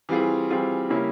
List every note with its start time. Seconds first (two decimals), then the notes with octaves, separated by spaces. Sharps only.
0.09 E3 G3 C4 F4 G#4
0.50 E3 G3 C4 F4 G#4
0.90 C#3 G3 A#3 C#4 E4